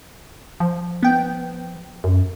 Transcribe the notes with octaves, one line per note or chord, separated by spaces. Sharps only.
F3
B3 G5
F#2